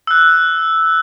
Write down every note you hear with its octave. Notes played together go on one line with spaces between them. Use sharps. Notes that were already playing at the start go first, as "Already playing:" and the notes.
E6 F#6